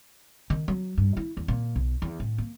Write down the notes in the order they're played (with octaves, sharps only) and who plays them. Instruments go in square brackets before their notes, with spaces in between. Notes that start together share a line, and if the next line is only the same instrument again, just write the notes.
[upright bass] D#3
F#3
G2
E4
E2
A#2
B1
E2
A2
A#3